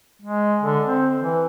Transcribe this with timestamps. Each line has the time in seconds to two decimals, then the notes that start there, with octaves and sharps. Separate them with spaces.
0.22 G#3
0.62 D3
0.86 C4
1.20 E3